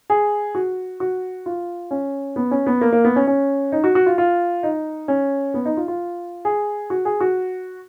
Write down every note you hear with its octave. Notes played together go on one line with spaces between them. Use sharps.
G#4
F#4
F#4
F4
C#4
B3
C#4
B3
A#3
A#3
B3
C#4
C#4
D#4
F#4
F#4
F4
F4
D#4
C#4
B3
D#4
F4
F4
G#4
F#4
G#4
F#4